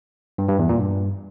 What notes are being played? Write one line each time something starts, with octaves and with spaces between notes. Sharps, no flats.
G2
G2
E2
A#2
G2